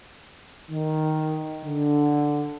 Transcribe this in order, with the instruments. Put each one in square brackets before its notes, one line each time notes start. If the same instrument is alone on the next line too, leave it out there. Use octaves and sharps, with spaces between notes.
[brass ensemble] D#3
D3